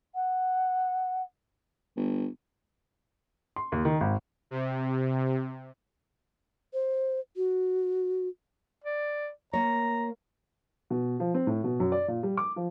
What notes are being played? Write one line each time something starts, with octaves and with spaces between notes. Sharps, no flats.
F#5
G1
C6
D#2
D#3
G#1
C3
C5
F#4
D5
A#3 C#5 A#5
B2
F3
C4
A2
B2
F#2
D5
A#2
G3
D6
F3